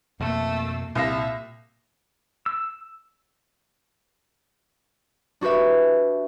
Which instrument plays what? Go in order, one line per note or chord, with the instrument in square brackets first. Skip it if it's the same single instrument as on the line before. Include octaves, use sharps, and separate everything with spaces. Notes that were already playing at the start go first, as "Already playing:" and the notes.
[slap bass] F2 B2 [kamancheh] A3 E6 [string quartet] A#3
[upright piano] C2 F5 A#6 [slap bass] A#2 [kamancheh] E5
[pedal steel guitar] E6
[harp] D4 F#4 G4 B4 E5